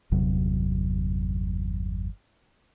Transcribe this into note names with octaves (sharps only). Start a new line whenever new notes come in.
G1 E2 C3 F#3